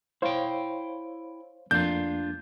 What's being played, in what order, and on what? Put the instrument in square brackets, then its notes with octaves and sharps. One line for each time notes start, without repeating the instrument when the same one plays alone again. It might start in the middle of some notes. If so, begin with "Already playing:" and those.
[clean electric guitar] E4 G5 [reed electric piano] C5 C#5 F5
[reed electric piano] F2 A3 A#3 [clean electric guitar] D4 F4 [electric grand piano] G6